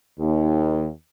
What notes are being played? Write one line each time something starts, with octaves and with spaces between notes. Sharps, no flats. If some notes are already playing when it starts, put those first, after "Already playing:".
D#2